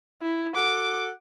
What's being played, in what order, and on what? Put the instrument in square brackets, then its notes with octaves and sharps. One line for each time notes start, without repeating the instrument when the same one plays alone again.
[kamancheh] E4
[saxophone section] F#4 A4 F#5 [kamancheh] D6